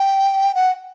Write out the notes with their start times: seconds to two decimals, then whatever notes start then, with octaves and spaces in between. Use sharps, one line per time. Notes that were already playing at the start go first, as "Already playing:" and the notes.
Already playing: G5
0.55 F#5